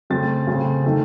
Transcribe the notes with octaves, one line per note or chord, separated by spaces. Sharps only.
C#3 A3 C4 A6
C#3 A3 C4
D#3 A3 C4